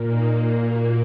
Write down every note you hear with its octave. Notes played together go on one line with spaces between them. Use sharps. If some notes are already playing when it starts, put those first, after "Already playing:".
Already playing: A#2 A#3
D#4
F#4